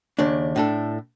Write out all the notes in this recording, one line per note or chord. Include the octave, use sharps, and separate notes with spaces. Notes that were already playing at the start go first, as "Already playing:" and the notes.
D#2 C#3 D4
A2 D4 A4